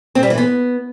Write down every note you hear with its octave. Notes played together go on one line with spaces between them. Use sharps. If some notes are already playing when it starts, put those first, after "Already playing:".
C4
G3
E3
B3